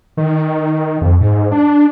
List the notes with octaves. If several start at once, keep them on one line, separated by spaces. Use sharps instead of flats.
D#3
F2
G#2
D4